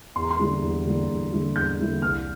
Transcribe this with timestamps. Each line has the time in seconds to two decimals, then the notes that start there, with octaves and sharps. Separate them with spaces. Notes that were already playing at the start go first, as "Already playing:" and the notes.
0.16 E2 C6
0.23 A#5
0.31 C6
0.39 D3 G3 A#3 E4
0.62 E2
0.85 D3 G3 A#3 E4
1.09 E2
1.32 D3 G3 A#3 E4
1.56 E2 G6
1.79 D3 G3 A#3 E4
2.02 C2 F6